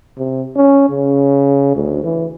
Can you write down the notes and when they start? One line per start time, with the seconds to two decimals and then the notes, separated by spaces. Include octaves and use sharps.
0.18 C3
0.56 C#4
0.90 C#3
1.75 D2
2.04 E3